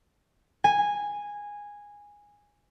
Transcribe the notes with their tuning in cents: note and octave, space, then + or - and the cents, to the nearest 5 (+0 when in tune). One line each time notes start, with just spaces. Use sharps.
G#5 -10